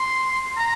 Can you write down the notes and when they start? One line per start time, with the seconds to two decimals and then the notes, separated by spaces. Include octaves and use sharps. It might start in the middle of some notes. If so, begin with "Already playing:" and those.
Already playing: C6
0.57 A#5